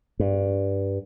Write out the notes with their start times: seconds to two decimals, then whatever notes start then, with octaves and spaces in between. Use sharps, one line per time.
0.20 G2